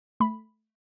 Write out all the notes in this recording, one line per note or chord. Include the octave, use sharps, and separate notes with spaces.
A3 B5